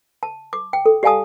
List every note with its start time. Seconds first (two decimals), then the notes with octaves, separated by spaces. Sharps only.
0.23 A5
0.53 D6
0.73 G5
0.86 A4
1.03 G4 D5 F5 G#5 A5 D#6